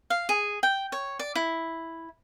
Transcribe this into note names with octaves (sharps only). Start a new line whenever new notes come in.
F5
G#4
G5
C#5
D5
E4